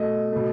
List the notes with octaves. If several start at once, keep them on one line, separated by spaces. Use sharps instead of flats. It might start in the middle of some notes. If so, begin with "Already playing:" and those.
Already playing: B2 A3 D#5
B2 A3